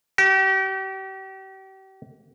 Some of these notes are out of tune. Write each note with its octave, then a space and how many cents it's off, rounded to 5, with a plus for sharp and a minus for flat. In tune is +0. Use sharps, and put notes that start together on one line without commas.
G4 -40